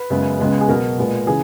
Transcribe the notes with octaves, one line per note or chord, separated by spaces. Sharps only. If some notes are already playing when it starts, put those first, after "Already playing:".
Already playing: B4
F#2 C#3 G#3 B3
C#2 C#3 G#3 B3
G#4
B2 F#3 B3 A#4
A#2 G#3 B3
C#3 E3 G#4